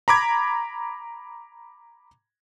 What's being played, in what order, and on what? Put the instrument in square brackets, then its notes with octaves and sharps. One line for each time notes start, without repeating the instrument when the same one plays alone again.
[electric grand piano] A#5 B5 D6 G#6